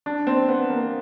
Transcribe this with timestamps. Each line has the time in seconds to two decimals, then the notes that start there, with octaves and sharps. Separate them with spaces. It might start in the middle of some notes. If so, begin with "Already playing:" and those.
0.06 D4
0.27 C4
0.49 B3
0.70 A#3